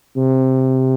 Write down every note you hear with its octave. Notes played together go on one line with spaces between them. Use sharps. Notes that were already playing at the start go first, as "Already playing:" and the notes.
C3